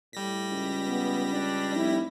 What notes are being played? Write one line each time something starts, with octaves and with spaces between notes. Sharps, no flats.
A2 G3 A#6 B6
C#2
B3
D4
F1 E4